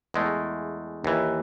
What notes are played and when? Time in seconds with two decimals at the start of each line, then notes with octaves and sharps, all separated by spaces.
0.14 E2 G#3 A3
1.04 D#2 E3